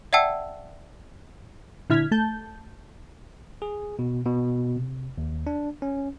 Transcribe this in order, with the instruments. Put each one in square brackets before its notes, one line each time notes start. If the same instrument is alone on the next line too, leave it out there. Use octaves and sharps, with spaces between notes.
[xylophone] D5 E5 F#5 G5 A5 E6
[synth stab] A#2 D3 E4 F6 G#6 B6
A3 A5 G6
[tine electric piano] G#4
B2
B2
C3
D#2
D4
C#4